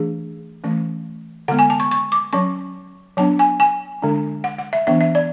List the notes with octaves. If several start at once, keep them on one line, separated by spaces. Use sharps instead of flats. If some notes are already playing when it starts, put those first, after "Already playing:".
Already playing: E3 A3 D4 G#4
E3 A3 C#4
D3 G#3 B3 F#5
G#5
A5
C#6
C#6
D6
F#3 C#4 C#6
F#3 B3 D4 A5
G#5
G#5
D3 G#3 D4
F#5
F#5
E5
E3 B3 D4 E5
E5
D5